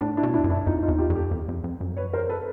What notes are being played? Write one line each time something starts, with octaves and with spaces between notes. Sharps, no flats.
A2 D4
D4 E4
B2
D4 E4
F2
F#2
D4 E4
F2 D#4 F4
D#4 F4
E2
F4 G4
F2
G4 A4
E2
F2
F2
F#2
B4 C#5
A#4 C5
A4 B4